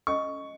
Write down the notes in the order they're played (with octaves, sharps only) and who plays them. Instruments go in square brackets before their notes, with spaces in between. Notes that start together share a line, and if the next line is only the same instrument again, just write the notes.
[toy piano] C#4 A4 D#5 [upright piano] C#6